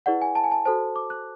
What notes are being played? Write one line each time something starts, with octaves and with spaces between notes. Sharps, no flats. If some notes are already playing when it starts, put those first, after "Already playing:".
E4 G#4 B4 D5 F#5
G#5
A5
G#5
A5
F#4 A4 C5 A5
D6
F#6